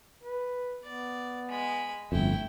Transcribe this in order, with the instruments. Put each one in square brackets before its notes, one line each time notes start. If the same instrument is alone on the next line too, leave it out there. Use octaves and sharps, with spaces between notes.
[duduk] B4
[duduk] B3 [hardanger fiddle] D5
[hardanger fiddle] G#3 B5
[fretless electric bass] G1 F2 [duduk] A3 [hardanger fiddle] E4 G5